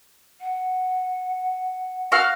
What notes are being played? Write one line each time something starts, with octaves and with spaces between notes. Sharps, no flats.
F#5
F#4 F5 F6